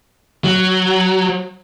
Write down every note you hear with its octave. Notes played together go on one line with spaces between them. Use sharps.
F#3